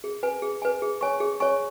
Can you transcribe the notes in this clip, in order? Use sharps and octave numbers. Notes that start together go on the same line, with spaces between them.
G#4
B4 G#5
G#4
B4 G#5
G#4
C#5 G#5 C#6
G#4
C#5 G#5 C#6